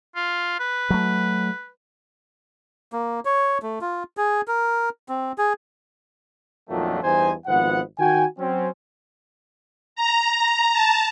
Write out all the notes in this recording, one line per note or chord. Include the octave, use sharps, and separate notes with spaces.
F4
B4
F#3 A3
A#3
C#5
A3
F4
G#4
A#4
C4
G#4
F2 A#2 D#3 F#3 A3 D4
E2 G2 D#4 C5 G#5
G#1 F3 B3 F#5
D#3 F#4 G5 G#5
F#3 C4 C#4
A#5
A5